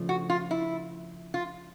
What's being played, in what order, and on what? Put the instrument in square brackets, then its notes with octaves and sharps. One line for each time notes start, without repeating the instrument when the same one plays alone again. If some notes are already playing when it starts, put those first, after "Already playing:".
Already playing: [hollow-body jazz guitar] C#3 F3 A3 D4
[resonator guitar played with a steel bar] F#4
F4
E4
F4